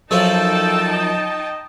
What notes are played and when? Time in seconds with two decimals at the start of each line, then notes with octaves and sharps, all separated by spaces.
0.11 F#2 F3 D#4 A4 G5 A5
0.93 D#5